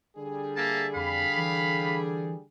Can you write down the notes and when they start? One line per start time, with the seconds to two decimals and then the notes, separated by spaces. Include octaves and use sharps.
0.17 D3 G3 G#4
0.57 A#3 E5 A5
0.95 F2 F5 B5
1.37 E3